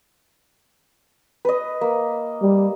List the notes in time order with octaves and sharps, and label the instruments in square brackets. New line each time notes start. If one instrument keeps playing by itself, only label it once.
[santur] B4 D#5
A#3
[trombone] G3